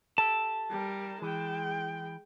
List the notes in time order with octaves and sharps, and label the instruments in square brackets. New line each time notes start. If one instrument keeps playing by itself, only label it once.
[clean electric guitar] G4 A4 [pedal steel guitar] A5
[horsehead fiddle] G3 A#4
[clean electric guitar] E3 [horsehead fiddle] G#3 G5